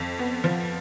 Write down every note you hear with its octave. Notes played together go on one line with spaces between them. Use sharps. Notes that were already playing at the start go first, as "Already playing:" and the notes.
Already playing: F2
B3
F3